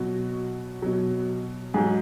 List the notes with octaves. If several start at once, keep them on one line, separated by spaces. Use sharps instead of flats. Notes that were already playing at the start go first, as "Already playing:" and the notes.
Already playing: B2 F#3 F#4
B2 F#3
G#2 F#3 G#4